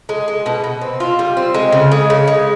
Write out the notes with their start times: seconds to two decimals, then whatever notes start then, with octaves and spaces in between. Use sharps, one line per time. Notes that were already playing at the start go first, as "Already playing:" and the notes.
0.09 G#3
0.28 G#3
0.46 B2
0.64 B2
0.81 C4
1.00 F4
1.19 G3
1.37 C4
1.54 G#3
1.73 C#3
1.92 G#3
2.10 C#3
2.28 G#3